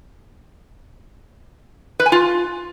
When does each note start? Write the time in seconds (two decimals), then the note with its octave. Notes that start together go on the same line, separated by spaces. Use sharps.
2.00 B4
2.06 G#5
2.12 F4